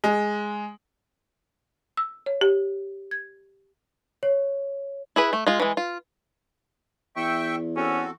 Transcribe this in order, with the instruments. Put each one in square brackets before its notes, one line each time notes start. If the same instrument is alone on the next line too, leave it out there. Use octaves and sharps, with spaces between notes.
[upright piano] G#3
[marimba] E6
C#5
G4
G#6
[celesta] C#5
[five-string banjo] E4 G#4 B4
A3
G#3 F4
E3 G#3
F4
[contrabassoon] E2 [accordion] E5 G5 C#6
[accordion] C4 F#4 A4 [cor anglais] C#4